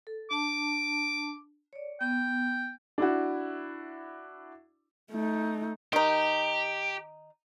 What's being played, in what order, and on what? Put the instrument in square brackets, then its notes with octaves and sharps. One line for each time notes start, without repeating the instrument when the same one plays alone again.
[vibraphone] A4
[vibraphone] D4 A5 [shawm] D6
[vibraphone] C#5 D5
[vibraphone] B3 [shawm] G5
[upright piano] D4 E4 F#4
[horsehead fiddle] A3 D#4
[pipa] D#3 D#4 [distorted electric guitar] G4